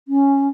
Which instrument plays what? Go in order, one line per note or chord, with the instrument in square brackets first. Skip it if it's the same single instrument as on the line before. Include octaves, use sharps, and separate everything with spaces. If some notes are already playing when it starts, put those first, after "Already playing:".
[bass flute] C#4